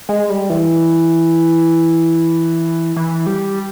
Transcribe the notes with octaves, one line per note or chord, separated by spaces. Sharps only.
G#3
G3
E3
E3
G3